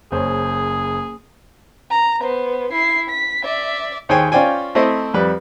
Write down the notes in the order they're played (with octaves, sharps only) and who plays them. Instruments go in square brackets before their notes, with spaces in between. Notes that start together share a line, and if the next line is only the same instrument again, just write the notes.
[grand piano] F#1 C5 C#5 [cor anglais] G#4
[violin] A#5
B3 C5
E4 C7
B6
D5 E5
[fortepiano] D#2 G#4 C5 C#5 G5 G#5
C#4 F4 C5 D5 G5 G#5
A3 C4 E4 C5 D#5
F2 G3 B4